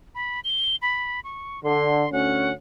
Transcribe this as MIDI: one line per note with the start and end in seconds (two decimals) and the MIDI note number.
0.15 0.40 83
0.44 0.76 103
0.82 1.20 83
1.24 1.60 85
1.64 2.06 50
1.64 2.12 84
2.12 2.50 38
2.12 2.50 61
2.12 2.52 78